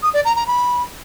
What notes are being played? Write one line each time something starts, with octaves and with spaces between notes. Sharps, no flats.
D#6
D5
A#5
A#5
B5